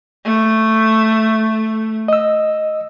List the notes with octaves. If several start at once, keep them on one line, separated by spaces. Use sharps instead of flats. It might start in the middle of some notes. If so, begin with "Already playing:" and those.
A3
D#5 E6